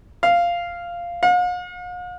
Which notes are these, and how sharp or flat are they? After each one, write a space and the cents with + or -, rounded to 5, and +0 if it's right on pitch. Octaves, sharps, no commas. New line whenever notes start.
F5 -10
F5 +45